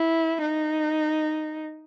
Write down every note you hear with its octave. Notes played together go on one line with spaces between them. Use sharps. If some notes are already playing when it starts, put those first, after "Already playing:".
Already playing: E4
D#4